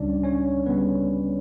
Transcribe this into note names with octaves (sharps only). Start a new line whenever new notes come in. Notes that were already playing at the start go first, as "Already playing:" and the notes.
Already playing: C#2 C#3 G3 C#4 D4 D5
C#4 C#5
C#3 G3 B3 C#4 B4